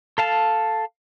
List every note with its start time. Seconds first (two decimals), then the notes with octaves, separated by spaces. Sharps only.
0.18 A4 F5 A5